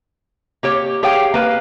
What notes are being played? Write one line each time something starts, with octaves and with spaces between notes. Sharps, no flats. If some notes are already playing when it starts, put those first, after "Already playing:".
A#3 G4 C#5
G4 G#4 C#5 F5 G5
A#3 B4 F5